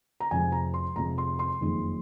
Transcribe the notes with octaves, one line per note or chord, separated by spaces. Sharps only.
A#5
F1 F2 C3 F3 G#3 G#5
A#5
C6
F1 F2 C3 F3 G#3 A#5
C6
C6
F#1 F2 D#3 G#3 D#4